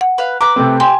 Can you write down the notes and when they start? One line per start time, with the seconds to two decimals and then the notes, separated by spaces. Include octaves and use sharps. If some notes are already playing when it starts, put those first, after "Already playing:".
0.01 F#5
0.18 B4 F5
0.41 B4 A#5 D6
0.56 C3 A3 C4
0.80 G4 G5 G#5 C6